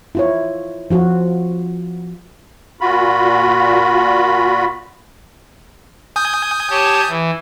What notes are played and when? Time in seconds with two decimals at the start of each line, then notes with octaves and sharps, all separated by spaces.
0.15 E4 F4 C#5
0.90 F3 F4 F#4
2.81 A#2 F4 F#4 B5
6.16 G#5 D#6 G6
6.70 G4 C#5 A5
7.08 E3